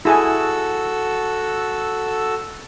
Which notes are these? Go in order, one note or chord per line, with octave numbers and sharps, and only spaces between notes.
E4 F#4 G#4 A4 G#5 E6